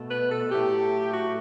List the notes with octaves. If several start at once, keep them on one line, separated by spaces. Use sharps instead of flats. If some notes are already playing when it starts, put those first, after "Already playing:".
Already playing: B2 A3
B4
A4
A2 F#3 A3 G4
F#4